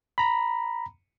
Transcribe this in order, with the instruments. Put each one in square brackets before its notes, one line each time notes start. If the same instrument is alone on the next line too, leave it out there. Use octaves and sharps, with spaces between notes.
[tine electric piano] A#5 B5